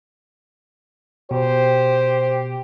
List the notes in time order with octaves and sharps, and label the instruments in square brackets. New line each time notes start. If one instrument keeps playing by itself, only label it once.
[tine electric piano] B2 [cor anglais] G4 [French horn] C5